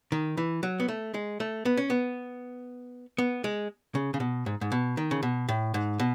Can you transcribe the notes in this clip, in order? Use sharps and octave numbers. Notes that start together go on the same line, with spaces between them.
D#3
E3
F#3
B3
A3
G#3
A3
B3
C#4
B3
B3
G#3
C#3
C#3
B2
G#2
G#2
B2
D#3
C#3
B2
A2
G#2
B2